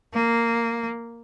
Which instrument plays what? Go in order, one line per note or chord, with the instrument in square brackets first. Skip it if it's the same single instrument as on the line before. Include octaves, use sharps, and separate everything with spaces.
[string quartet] A#3